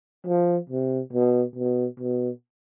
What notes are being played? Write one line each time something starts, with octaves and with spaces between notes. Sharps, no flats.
F3
C3
B2
B2
B2